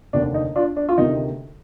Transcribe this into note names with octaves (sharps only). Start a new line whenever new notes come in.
F1 D#2 D3 D4
D#4
D4 F4
D4
F4
D2 C3 D#3 D#4